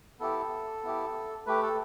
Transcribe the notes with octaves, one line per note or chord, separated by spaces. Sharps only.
B3 E4 G4 A4
B3 E4 G4
A3 G4 B4
A4